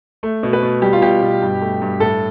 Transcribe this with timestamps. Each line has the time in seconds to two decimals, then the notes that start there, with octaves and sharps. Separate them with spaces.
0.23 A3
0.43 B2
0.53 B4
0.62 B2
0.82 G3 G4
0.93 F4
1.02 B2 G4
1.22 B2
1.42 G2
1.61 A3
1.82 G2
2.00 A2 A4